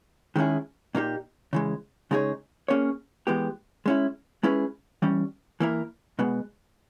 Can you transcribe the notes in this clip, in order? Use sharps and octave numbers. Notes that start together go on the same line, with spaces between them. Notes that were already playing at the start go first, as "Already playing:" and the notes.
D#3 G#3 C#4 E4 G#4
A#2 A#3 D#4 G4
C#3 E3 G#3
C#3 G#3 D#4 G#4 C#5
A#3 C#4 G#4 C#5
E3 G#3 B3 G4
G#3 C#4 E4
G#3 C#4 E4 G#4 B4
E3 G3 C#4
E3 A#3 E4 A#4
B2 G#3 B3